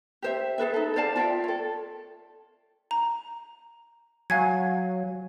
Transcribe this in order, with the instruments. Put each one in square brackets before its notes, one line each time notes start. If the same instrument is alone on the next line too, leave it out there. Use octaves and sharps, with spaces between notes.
[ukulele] G4 C5 E5
G#4 A4 B4 E5
D#4 A4
C5 D5 F5 A5
F4 D5 E5 G5
A4 C#5
[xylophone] A#5
[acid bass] F#3 [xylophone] F5 G#5 G#6